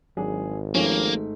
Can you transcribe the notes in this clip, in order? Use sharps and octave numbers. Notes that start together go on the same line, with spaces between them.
G#1 F#3 D4 G#4
G#2 F3 A3 A#3 C#4